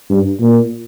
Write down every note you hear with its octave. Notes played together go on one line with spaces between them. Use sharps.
G2
A#2